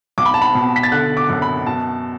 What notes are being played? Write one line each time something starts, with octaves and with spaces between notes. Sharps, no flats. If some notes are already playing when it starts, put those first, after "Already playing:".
B1 D6
B5
A5
B5
B2
B6
A6
D3 F#6
D6
F#2
B5
B2 A5